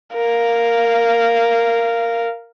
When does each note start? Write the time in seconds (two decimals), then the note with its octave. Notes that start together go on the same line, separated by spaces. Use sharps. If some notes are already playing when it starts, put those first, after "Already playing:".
0.14 A#4 F5